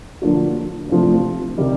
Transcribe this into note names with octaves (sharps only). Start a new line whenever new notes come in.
D3 F3 A#3 D4 F#4
C3 F3 A3 D4
C3 D#3 G3